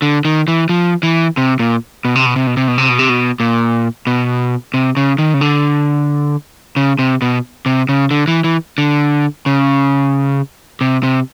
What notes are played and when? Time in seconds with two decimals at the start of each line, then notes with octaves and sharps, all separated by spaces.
0.02 D3
0.25 D#3
0.48 E3
0.69 F3
1.03 E3
1.37 C3
1.59 A#2
2.05 B2
2.15 C3
2.26 B2
2.36 C3
2.47 B2
2.57 C3
2.68 B2
2.78 C3
2.89 B2
2.99 C3
3.09 B2
3.40 A#2
4.07 B2
4.74 C3
4.97 C#3
5.18 D#3
5.34 C#3
5.41 D3
6.76 C#3
6.99 C3
7.22 B2
7.66 C3
7.89 C#3
8.11 D3
8.28 E3
8.44 E3
8.78 D3
9.46 C#3
10.81 C3
11.03 C3